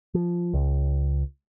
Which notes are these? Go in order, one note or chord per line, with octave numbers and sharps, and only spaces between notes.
F3
C#2